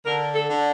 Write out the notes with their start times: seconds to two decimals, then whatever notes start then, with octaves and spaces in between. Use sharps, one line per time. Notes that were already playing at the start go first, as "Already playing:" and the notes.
0.06 D3 A#4
0.34 A4
0.49 D3